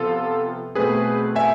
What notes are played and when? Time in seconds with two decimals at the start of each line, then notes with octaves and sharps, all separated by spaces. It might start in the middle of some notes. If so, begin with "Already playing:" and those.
Already playing: C3 F3 B3 F4 A4
0.75 B2 A3 C4 G#4 B4
1.36 E5 G#5